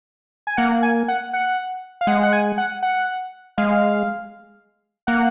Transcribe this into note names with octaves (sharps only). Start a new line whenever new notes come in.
G#5
A#3 F#5
G#5
F#5
F#5
F5
G#3 F#5
F#5
G#5
F#5
F#5
G#3 F5
A#3 F#5